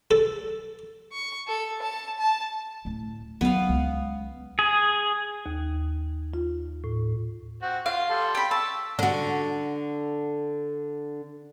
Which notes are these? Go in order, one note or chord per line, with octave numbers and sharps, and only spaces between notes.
A4
C#6
A4
A5
A5
D2 A2
F#3 B3 D#4 F5
C#2
G#4
D#2
F4
A2
C4 F#4
F4 F5
G3 A4 C6
G5 B5
A5 C#6 E6
D3 F#4